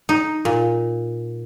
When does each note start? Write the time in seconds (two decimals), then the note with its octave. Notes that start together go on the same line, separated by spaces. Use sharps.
0.09 D#4
0.45 A#2